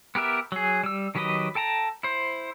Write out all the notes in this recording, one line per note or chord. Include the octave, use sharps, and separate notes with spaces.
B3 G4 A#4 E5
F#3 G#4
G3 E6
D#3 F#3 G4 B4 D#5
A4 G5 A5 A#5
E4 C5